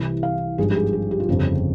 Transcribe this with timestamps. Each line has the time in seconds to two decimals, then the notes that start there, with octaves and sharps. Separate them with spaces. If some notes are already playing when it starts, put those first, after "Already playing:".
Already playing: C2 C3 E3
0.23 F5
0.58 G#1 G2 F3 G#4
0.71 G4
0.76 G#4
0.93 G#4
1.11 G4
1.20 F4
1.28 G1 F2 C#3 G4